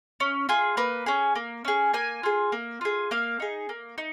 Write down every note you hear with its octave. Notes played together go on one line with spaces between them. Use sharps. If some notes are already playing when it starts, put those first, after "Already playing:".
C#4
F4 G#4
A#3 B4
C#4 G#4
A#3
C#4 G#4
A#3 G#5
F4 G#4
A#3
F4 G#4
A#3 F5
D#4 G#4
A#3
D#4